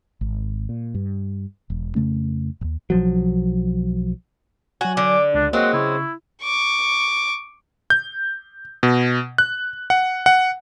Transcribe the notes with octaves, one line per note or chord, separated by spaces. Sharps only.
G#1
A#2
G2
E1
F2 C#3 A3 C#4
D1 D#2
B1 F3 F#3
F#3 F#4 G#5
D3 D6
C#2 D4
F#3 G#3 A#3 C4 F#4
C#3 E4 C#6
C#6 D6
G6
B2
F#6
F#5
F#5